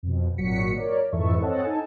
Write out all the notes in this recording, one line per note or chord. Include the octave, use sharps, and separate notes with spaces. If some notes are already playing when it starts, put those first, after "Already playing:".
F2 B2
G#1 A#2 F#3 F#4 B6 C#7
A#4 C#5 D5
F2 G#2 E3 A4 E5 C#6
C4 A4 C#5 D#5 F#5 A5
D#4 A4 G#5 A5